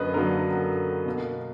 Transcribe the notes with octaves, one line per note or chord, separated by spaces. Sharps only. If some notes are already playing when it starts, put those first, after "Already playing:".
Already playing: F#2 D3 F#3 A#3 B4 D#5
F#2 D3 F#3 A#3 A#4
B2 A#3